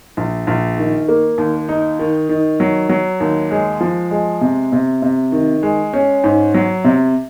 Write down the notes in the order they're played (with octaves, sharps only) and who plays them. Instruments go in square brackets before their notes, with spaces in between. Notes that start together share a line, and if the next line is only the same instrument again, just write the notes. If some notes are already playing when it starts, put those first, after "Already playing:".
[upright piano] A#1
A#1
D#3
A#3
D#2
D#4
D#3
D#3
F#3
F#3
D#2
G#3
F3
G#3
C3
C3
C3
D#3
G#3
C#4
G#2
F#3
C3